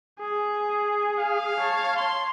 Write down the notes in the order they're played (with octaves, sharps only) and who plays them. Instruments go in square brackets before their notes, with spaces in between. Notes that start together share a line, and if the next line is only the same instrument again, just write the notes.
[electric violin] G#4
[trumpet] F5
[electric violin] C#5 A5
[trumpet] C6